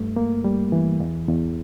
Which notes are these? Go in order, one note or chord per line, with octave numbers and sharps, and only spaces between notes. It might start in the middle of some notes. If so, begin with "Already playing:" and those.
Already playing: G2 A3
A#3
G3
E3
E2
E2